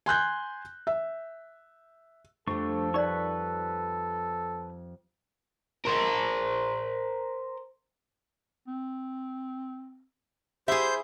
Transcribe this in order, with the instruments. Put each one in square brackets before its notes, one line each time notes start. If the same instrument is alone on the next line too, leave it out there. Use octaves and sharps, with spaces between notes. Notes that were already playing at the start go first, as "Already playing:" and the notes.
[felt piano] G#5 C6 F#6 G6
E5
[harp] F2 G3 [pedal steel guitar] A3 D4 C#6 [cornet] A4
[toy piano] D#4 A#4 D5 [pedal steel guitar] B4 C#6
[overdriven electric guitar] A#4 C5
[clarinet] C4
[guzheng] E4 G#4 [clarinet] G4 [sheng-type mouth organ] C5 G6 [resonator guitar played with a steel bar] E5